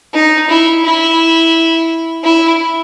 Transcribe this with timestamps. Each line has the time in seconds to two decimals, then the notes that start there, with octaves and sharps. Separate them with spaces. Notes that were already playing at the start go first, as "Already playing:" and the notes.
0.14 D#4
0.49 E4
0.85 E4
2.24 E4